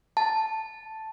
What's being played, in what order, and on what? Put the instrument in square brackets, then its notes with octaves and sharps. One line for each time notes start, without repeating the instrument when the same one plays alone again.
[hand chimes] A5